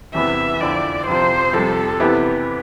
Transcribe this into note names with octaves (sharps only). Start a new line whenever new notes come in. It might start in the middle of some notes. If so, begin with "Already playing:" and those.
E2 C3 E3 B3 E5
F2 D3 F3 C4 E4 D5
F2 C3 F3 C5
F2 C3 G3 A4
C3 E3 B3 E4 G4